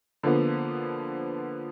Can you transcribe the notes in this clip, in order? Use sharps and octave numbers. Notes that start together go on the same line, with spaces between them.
D3 F3 A#3 B3